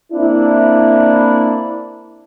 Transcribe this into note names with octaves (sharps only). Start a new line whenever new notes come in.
A#3 C4 D4 E4